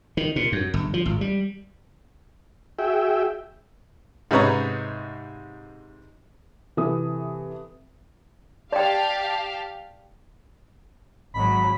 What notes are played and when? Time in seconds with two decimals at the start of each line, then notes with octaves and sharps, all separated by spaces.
0.17 D#3
0.36 A#2
0.52 F#2
0.74 G1
0.94 F3
1.06 G#1
1.21 G3
2.79 F#4 G#4 E5 G5
4.31 G#2 C3 D#4 B4 C#5 A#5
6.77 C3 E3 A4 D#6
8.72 G4 D5 F5 G5 A5
11.34 G#1 F#3 B5